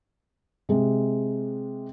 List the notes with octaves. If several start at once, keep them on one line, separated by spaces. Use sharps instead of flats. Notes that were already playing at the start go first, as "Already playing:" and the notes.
C3 G#3